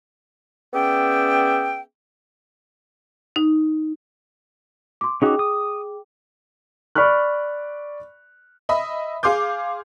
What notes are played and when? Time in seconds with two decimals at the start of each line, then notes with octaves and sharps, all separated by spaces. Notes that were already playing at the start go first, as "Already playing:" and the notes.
0.74 B3 C#4 G#4 D5 E5 G5
3.36 D#4
5.01 C6 D6
5.22 C#4 D#4 F#4 G#4 G5 D6
5.39 D#6
6.95 D5 B5 C#6 F6 F#6
8.69 D#5 E5 B5
9.23 G#4 F5 C6 D6 G6